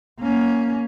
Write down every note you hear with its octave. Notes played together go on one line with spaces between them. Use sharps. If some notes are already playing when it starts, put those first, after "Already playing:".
A#3 C#4